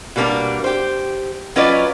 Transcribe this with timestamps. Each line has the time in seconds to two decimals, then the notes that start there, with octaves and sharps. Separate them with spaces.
0.16 B2 G3 A#3 B3 D4 A#4
0.64 G4 C5
1.56 F#3 C#4 F4 B4 D5 D#5